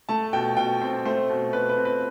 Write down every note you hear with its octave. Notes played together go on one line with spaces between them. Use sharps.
A3 A5
B2 G5
B2 G5
C4
A3 C5
B2
B2 B4
B4
C4
B4